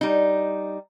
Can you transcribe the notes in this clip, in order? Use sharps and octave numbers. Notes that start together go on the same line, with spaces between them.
G3 D#4